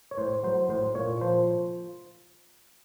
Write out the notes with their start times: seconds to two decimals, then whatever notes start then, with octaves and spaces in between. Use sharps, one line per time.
0.11 C#5
0.18 A2 C5
0.43 F#3 C5
0.69 A2 C5
0.95 A#2 C#5
1.21 F3 C5